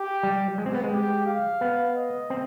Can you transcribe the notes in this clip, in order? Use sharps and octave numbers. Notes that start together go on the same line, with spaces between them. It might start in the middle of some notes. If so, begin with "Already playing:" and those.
Already playing: G4
G3
G#3
C4
B3
G#3
G4
F5
B3
D#5
C4